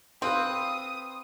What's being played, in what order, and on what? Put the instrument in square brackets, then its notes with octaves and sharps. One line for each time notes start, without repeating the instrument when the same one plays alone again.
[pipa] C4 [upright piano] B4 F5 C6 [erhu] D#6